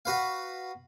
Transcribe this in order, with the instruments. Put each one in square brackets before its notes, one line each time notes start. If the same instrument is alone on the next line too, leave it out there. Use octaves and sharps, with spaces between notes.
[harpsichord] F#4 B4 F5